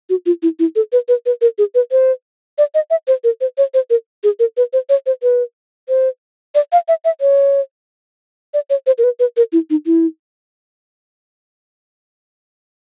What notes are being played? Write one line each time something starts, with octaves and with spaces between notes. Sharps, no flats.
F#4
F4
E4
E4
A4
B4
B4
B4
A#4
G#4
B4
C5
D5
D#5
E5
C5
A#4
C5
C#5
C5
A#4
G#4
A#4
B4
C5
C#5
C5
B4
C5
D5
F5
E5
E5
C#5
D5
C#5
C5
A#4
B4
B4
A#4
E4
D#4
E4